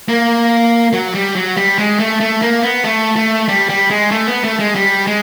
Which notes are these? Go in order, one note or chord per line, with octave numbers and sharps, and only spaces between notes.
A#3
F#3
G3
F#3
G3
G#3
A3
A3
A#3
B3
A3
A3
G3
G3
G#3
A3
B3
A3
G#3
G3
G#3